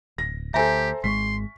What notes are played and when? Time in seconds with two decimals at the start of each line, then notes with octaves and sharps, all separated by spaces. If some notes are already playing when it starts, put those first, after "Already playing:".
0.18 D1 A#6
0.54 D2 G4 A4 C5 E5 G#5 A#5
1.04 G#1 G#3 C6 C#6 B6